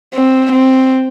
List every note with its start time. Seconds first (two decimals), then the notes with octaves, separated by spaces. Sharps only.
0.14 C4
0.52 C4